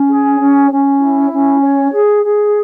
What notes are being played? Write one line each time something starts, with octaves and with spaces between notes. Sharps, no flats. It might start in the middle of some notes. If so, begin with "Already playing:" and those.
Already playing: C#4
G#4
C#4
C#4
E4
C#4
C#5
G#4
G#4